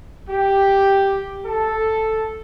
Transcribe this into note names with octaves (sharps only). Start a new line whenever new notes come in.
G4
A4